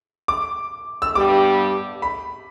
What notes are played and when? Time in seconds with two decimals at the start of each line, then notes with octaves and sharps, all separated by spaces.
0.28 D6
1.02 E6
1.15 G2 G3 B3 G4 D6
2.02 B5